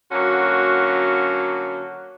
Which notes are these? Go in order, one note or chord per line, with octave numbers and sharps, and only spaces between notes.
D3 F#3 A#3 C#4 F#4